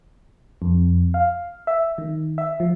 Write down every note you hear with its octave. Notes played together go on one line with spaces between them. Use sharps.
F2
F5
E5
D#3
E5
F3